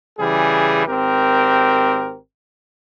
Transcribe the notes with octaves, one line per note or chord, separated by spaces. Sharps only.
C#3 E3 G3 G#4
G#1 C4 G4 A#4